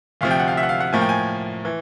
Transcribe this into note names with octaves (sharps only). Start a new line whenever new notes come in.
D2 C3 F3 F5
G5
F#5
F5
E5
F#5
F5
F#5
A2 F3 A#3 G#5
G5
G#5
E3